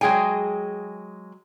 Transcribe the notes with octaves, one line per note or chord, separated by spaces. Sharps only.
F#3 G#3 G#4 G5 G#5